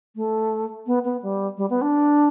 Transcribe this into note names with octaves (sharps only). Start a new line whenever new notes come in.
A3
B3
B3
G3
G3
B3
D4